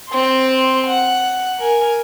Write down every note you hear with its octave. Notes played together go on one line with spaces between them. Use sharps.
C4 C6
F#5
A#4 G#5